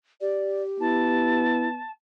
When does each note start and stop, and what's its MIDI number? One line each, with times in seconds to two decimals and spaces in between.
0.21 1.43 67
0.21 0.63 74
0.80 1.83 59
0.80 1.69 64
0.80 1.91 81